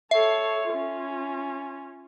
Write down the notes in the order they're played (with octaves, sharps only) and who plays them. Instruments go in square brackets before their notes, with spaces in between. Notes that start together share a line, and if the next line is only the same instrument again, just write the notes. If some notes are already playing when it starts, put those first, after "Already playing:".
[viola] A4 C#5 [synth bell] E5
[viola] C#4 F4